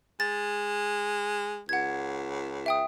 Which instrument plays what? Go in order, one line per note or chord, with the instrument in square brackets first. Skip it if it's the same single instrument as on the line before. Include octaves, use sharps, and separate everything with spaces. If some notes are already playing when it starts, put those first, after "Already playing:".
[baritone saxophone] G#3 [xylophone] A6
[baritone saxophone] C#2 [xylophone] F#5 G#6
[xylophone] E5 G5 D#6